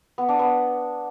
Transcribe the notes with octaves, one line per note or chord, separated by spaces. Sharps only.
B3
D4
B3